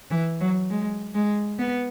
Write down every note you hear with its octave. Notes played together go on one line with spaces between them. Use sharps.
E3
F#3
G#3
G#3
B3